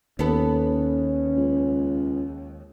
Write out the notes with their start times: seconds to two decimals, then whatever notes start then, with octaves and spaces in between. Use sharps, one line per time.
0.19 D#2 B3 C#4 A4
1.36 C#2